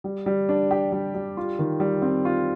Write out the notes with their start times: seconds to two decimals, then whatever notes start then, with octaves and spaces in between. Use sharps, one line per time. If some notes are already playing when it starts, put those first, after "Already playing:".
0.04 G3
0.26 G3
0.49 D4
0.71 G4
0.92 G3
1.14 G3
1.37 F4
1.59 D#3
1.80 G3
2.02 C4
2.25 F4